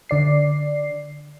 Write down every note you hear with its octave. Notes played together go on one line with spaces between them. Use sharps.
D3 D5 C7